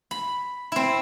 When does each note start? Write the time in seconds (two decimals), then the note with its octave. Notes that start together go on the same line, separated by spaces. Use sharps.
0.11 B5
0.72 C4 E4